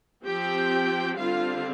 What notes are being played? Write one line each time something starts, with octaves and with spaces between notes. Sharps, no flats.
F3 C4 G4 G5
D3 G3 C4 F4 F5